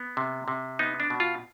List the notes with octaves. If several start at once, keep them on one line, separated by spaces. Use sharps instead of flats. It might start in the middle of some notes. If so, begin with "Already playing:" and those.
Already playing: B3
C3
C3
B3 D#4
D4
B2
F4